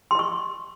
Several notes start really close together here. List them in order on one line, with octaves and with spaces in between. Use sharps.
C6 D#5 C#6